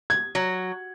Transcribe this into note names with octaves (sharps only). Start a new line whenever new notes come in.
G#6
F#3